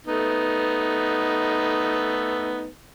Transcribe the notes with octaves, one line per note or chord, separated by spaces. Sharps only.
A3 B3 D#4